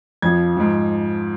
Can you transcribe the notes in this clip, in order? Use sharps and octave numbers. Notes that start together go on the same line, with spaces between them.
F2 F3 G#6
G#2 F3